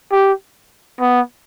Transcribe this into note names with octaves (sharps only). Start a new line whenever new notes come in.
G4
B3